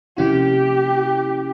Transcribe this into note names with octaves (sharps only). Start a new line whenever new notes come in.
C3 F3 A#3 C#4 E4 G4